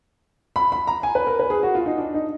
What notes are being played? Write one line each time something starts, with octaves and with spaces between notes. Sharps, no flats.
B5
B5
A#5
G#5
B4
A#4
B4
G#4
F#4
F4
D#4
D4
D#4